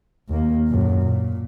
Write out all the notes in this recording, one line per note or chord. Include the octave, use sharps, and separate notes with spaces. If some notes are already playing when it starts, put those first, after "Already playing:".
D#2 A#3
F#2 A#2
A#2